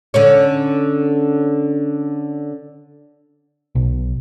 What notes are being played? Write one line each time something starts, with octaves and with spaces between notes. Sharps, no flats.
D3 C#4 C#5
B1